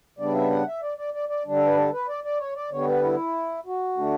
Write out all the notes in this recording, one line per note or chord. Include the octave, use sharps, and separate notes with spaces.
C#3 G3 B3 D4 D5
E5
F#5
E5
D5
D5
D5
D5
D3 G3 D4
A4
B4
A4
B4
D5
D5
C#5
D5
D3 G3 B3 C#5
B4
E4
F#4
D3 A3 D4